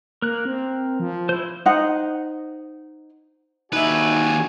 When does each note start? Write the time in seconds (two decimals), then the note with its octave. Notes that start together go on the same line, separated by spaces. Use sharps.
0.22 A#3 A#4 F#6
0.45 C4
1.00 F3
1.29 E4 C5
1.66 D#4 C5 D#5 F#5
3.72 D#2 D#4 F#4 B4 D5 E5 G#5